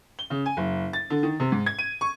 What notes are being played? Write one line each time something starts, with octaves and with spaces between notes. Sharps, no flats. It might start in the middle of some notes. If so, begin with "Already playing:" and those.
G7
C#3
G#5
F#1
A6
D3
D#3
C3
G#2
G#6
D#7
C#6